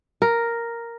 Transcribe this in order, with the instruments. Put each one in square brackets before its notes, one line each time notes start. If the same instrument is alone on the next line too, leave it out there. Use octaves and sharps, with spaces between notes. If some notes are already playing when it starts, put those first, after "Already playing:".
[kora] A#4